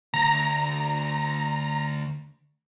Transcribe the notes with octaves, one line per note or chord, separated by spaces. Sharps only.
D2 A#5 A#6